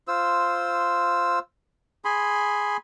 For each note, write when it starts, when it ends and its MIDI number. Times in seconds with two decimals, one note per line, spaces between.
0.08 1.39 65
0.08 1.39 72
0.08 1.39 88
2.05 2.77 68
2.05 2.77 80
2.05 2.77 83
2.05 2.77 84